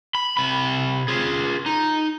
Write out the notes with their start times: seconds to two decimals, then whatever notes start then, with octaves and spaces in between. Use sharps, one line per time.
0.15 B5
0.37 C3 B5
1.08 F4 G#4
1.66 D#4